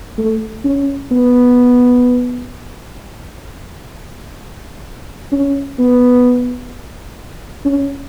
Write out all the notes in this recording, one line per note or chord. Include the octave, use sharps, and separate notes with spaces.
A3
C#4
B3
C#4
B3
C#4